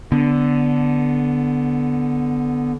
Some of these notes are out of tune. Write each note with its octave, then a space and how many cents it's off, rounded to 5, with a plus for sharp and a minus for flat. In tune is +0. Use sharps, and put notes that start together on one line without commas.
D3 -10 B3 +0